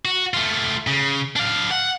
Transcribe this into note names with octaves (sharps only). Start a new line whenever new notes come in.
F#4
A3 F4
C#3
D4 F5
F#5